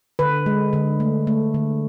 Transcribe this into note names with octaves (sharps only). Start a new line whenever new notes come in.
D3 B4
G#3
D3
A3
A3
D3